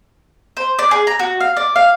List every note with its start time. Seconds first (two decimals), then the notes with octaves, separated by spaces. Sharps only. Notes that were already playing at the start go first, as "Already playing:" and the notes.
0.57 C5
0.79 D5
0.91 G#4
1.07 A#5
1.19 F#4
1.41 F5
1.57 D5
1.76 F5